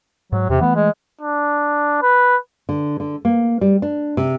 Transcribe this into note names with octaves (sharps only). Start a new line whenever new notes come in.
G#2 F#3
E2 C3
E3 A3 B3
G#3
D4
B4
D3
D3
A#3
G3
D4
C3